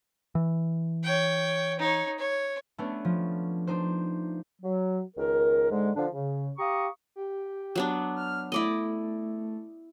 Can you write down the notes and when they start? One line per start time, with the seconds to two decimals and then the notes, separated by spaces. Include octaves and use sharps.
0.35 E3
1.04 C#5 G5
1.79 D#4 C#5
2.18 C#5
2.78 A3 B3 C#4 D4
3.05 F3
3.67 D4 D#4 C5
4.62 F#3
5.17 C#2 D#3 A#4
5.71 G#2 D3 G#3
5.96 D3 F3 D4
6.12 C#3
6.58 G4 F5 A#5 C#6 D#6
7.16 G4
7.75 F#3 B3 D4
8.16 F6
8.52 A3 E4 D5 D#5